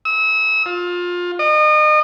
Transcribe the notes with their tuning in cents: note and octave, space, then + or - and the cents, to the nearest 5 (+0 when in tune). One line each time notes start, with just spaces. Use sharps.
E6 -35
F4 +20
D#5 -35